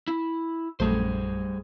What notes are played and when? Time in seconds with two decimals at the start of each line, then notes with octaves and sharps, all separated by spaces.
0.08 E4
0.80 A#1 F#2 G3 A3 G#4 C5